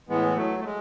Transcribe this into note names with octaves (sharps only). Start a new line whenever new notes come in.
A2 E3 G#3 B3
F#3 A3
A3
G#3